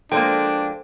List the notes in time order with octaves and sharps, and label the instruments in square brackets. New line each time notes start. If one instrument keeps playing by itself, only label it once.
[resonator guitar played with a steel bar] F3 G#3 A#3 [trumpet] D4 [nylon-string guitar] A4 C5 [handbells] G5